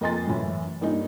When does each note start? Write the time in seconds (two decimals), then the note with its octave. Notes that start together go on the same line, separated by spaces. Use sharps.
0.01 F2 A#3 D#5 G#5 C6 A6
0.27 F#2 A2 E3 C#4
0.81 G2 A#3 C#4 D#4